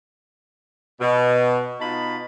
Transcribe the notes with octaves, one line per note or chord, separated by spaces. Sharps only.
B2
B2 D#4 F4 A5 B5